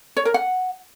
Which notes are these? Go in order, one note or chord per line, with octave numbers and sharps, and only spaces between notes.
C#5
A#4
F#5